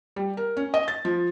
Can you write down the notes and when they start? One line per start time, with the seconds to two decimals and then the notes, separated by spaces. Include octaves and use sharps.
0.16 G3
0.37 A#4
0.57 C#4
0.74 D#5
0.88 A6
1.05 F3